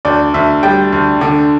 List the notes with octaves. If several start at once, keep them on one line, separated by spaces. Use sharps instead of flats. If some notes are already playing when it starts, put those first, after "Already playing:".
D2 D5
D2 E5
G3 G5
D2
D3